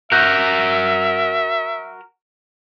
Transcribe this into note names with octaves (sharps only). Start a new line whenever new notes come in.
F#4 A#4 E5 F#6 G6 A#6